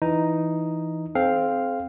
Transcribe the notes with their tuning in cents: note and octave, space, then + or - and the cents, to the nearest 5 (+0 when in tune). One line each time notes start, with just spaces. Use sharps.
E3 +0 D#4 +0
C4 +0 A4 -45 F5 +0